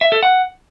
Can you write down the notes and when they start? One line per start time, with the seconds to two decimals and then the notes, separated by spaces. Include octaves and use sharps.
0.01 E5
0.12 A4
0.23 F#5